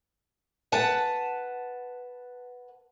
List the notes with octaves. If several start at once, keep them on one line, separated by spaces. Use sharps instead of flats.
B4 F#5 A5